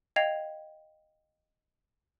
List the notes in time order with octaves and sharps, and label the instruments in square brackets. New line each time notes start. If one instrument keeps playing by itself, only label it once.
[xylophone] D#5 F5 G5 G#6 C7 F7